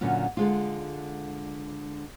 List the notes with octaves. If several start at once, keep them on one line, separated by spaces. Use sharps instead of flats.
A#2 D3 F#3 C#4 F4
D3 G#3 F4